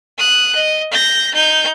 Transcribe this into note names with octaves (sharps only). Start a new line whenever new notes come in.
D#6 F#6
D#5
G6 A#6
D#4 G6